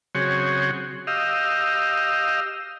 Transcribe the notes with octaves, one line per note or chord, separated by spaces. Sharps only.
C#3 F#3 C4 F#4 G#4 C#5
G4 D#5 F5 E6